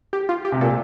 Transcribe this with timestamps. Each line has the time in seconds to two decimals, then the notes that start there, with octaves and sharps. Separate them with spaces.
0.13 G4
0.29 F4
0.45 G4
0.52 C3
0.61 A#2 A4